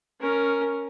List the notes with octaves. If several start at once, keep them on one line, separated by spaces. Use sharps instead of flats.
C#4 A#4